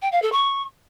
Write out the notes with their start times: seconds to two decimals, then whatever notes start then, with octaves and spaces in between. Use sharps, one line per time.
0.02 G5
0.12 F5
0.22 A4
0.32 C#6